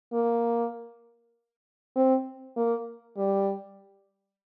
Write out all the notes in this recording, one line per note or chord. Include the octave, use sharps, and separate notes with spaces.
A#3
C4
A#3
G3